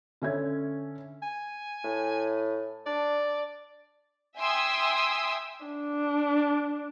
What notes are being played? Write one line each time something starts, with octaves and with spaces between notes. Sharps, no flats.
D3 C#4 E5 G#6
G#5
A2
D4 D5
E5 G5 G#5 C6 D#6 E6
D4